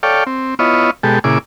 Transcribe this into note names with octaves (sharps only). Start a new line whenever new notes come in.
A4 C#5 D5 F5 G5
C4
B3 E4 F4 C#5 D#5
B2 G#3 G4 A4
A#2 C#3 E4 G#4 D6